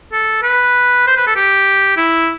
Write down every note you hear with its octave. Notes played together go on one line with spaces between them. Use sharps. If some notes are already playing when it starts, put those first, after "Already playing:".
A4
B4
C5
B4
A4
G4
E4